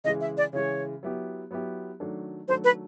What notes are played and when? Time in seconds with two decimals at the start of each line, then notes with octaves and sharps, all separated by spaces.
0.04 C#3 E3 G#3 D#5
0.21 E5
0.37 D5
0.53 C#3 E3 G#3 C#5
1.03 F#3 B3 E4 G4
1.51 F#3 B3 E4 G4
2.00 D#3 F#3 A3 D4
2.48 D#3 F#3 A3 D4 C5
2.64 B4